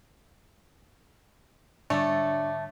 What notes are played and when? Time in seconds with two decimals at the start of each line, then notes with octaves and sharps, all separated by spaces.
1.90 G#2 D3 G3 A3 D4 C#5 D5 E5